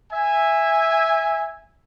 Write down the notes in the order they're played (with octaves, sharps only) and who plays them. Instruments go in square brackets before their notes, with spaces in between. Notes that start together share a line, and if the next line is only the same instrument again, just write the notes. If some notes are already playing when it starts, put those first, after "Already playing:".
[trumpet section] E5 G#5